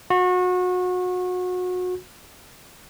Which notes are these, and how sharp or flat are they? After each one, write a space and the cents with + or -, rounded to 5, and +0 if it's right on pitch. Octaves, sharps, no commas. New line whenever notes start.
F#4 -30